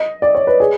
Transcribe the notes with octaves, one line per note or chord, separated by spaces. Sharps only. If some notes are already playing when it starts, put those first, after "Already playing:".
Already playing: D#5
D5
C#5
B4
G#4